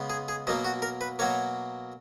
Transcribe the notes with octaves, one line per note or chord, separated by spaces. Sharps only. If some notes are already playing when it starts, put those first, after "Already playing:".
Already playing: C#3 G#3 B3
G#4
G#4
B2 F#3 A#3 D#4
F#4
A#4
B4
B2 F#3 A#3 C#5